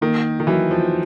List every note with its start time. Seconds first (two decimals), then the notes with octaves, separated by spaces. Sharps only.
0.01 D#3 A#3
0.40 D#3
0.47 E3 F#3
0.71 F3